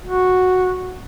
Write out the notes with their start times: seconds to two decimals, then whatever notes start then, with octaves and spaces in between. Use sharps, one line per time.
0.04 F#4